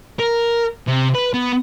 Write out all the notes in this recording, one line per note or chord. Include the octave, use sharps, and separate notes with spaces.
A#4
C3
B4
B3